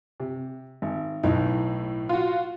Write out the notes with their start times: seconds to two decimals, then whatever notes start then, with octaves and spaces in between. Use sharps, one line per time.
0.20 C3
0.82 G#1
1.23 B1 A2 D#4
2.09 F4 F#4